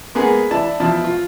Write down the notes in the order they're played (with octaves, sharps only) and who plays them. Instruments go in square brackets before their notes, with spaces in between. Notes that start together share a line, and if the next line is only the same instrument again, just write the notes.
[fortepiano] G#3 A#3 B3 G#4
D4 E4 A5
B2 F3 E4 A5
F4